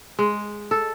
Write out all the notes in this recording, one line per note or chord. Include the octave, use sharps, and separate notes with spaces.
G#3
A4